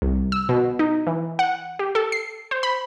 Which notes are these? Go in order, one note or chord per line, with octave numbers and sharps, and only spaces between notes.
C2
E6
B2
D#4
E3
F#5
G4
A4
C7
C5
B5